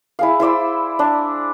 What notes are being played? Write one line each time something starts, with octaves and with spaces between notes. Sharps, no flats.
E4 G#4 F5
E4 C5 D5 E6
D4